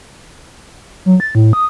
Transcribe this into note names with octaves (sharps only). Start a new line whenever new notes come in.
F#3
A6
A2
D#6